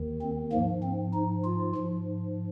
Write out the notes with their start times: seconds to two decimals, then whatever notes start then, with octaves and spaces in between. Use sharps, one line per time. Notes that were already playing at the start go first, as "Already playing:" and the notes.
Already playing: D#2 D#3
0.22 C4
0.52 G#2 F3 A#3
0.83 C4
1.13 D#4
1.44 F4
1.75 G#2 F3